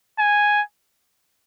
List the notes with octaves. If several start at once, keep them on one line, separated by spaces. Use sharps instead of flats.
G#5